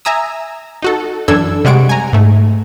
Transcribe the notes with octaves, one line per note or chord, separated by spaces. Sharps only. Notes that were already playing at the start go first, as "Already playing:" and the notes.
E5 G#5 A#5 D#6 E6
D#4 F#4 A4
F#2 E3 D4 A4 E6 G#6
C3 G3 G#3 F#5 C#6 D7
G#5 A#5
G#2 A3